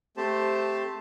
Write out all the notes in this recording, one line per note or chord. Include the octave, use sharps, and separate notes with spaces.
A3 C4 G4 C5 A5